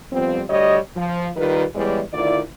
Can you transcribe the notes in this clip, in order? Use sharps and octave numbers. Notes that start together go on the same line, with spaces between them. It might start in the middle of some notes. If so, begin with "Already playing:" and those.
F2 F3 G3 B3 C4
D2 G3 C#5 D#5
F3
D#3 G3 F4 A#4 B4
E2 E3 G3 G#3 C#5 D5
D2 D#3 E4 F4 D5